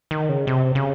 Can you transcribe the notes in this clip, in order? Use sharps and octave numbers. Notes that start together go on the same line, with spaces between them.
D#3
C#3
C3
C#3